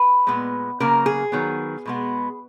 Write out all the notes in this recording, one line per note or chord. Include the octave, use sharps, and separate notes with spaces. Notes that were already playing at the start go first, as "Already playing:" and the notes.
Already playing: B4
A#2 G#3 B3
C#3 F#3 A#3 A#4
G#4
D#3 F#3 B3
B2 G#3 B3